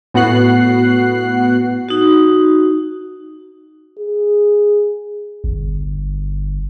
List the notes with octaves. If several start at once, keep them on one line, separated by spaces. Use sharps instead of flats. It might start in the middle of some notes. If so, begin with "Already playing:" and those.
A2 B3 F#4 F#5 F#6 C7
D#4 F#4
G#4
G1